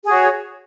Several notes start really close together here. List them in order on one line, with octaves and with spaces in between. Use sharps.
G#4 F#4 C#5